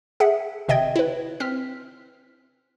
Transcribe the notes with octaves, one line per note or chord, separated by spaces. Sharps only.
G#4 E5 F#5
G#1 C3 D#5 E5 G5 G#6
E4 B4
C4 F6 B6